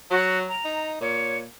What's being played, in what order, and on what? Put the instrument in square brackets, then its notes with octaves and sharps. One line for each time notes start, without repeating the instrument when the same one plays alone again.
[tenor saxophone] F#3 [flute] F#4
[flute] A#5
[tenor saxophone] D#4
[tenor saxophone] A#2 [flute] C#5